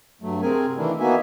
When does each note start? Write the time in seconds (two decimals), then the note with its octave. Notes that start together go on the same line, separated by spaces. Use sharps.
0.22 G2 F#3 A3
0.42 C3 C4 G#4 A#4 G#5
0.77 D#3 E3 A3 A#3 D4 E4
1.00 A#3 B3 D#4 F#4 E5 G#5